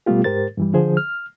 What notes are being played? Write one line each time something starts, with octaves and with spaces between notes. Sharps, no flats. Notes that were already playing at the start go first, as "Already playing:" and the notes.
B2 G3 A3 B3 F4 G4
G#2 G4 A#4 C5 A6
G2 E3 G3
D3 F3 G#4 C5
F6